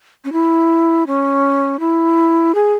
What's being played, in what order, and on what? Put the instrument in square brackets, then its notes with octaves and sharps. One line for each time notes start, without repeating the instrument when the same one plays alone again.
[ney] C#4
E4
C#4
E4
G#4